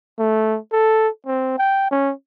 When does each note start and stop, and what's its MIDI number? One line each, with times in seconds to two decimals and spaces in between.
0.19 0.58 57
0.72 1.08 69
1.27 1.54 60
1.58 1.89 79
1.91 2.12 61